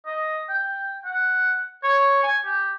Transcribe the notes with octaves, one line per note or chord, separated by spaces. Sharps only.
D#5
G5
F#5
C#5
G#5
G4